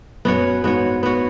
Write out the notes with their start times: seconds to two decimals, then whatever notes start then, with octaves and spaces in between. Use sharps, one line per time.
0.25 F#2 B3 F#4 C#5
0.64 G#2 B3 F#4 C#5
1.03 B3 F#4 C#5